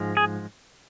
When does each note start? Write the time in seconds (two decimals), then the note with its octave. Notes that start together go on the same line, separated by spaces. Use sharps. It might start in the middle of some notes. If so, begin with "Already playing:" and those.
Already playing: G#2 F3 G#3
0.17 G#4